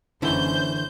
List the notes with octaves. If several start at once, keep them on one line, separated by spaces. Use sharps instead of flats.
F#1 D3 E3 C#4 E4 C5 G6